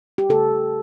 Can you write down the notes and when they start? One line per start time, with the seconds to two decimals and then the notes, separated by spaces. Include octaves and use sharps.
0.18 G4
0.29 C#3 A4
0.52 C#3